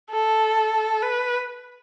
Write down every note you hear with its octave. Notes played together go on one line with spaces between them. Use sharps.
A4
B4